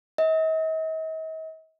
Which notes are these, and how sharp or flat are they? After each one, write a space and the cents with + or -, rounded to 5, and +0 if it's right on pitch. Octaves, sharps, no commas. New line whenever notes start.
D#5 +45